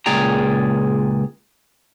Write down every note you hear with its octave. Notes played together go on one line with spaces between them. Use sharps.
C#2 A#2 G#4 D5 G5 A#5